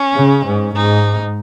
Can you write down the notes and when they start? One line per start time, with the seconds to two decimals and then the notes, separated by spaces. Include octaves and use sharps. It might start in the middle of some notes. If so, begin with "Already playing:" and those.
Already playing: C#4
0.15 C#3
0.45 G#2
0.76 G#2 D#4